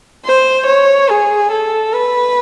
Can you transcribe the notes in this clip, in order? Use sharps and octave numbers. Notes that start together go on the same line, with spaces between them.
C5
C#5
G#4
A4
B4